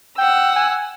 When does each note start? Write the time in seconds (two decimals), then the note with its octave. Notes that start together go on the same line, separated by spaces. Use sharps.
0.18 F#5 G5 E6
0.56 G#5